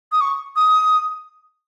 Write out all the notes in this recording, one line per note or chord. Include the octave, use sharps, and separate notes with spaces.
D#6
C#6
D#6